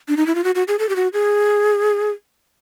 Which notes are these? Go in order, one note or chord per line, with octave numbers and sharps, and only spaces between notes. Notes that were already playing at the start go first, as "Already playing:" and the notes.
D4
D#4
E4
F4
F#4
F#4
G#4
A4
G4
F#4
G#4